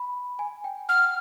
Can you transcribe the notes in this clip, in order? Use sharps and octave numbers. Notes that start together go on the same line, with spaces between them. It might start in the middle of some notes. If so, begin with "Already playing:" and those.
Already playing: B5
G#5
G5
F#5 F6